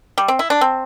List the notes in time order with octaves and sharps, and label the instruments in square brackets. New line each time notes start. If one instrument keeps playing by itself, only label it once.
[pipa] G3
C4
E4
D4
C4